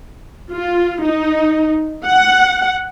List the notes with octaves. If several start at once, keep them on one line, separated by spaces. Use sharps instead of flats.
F4
D#4
F#5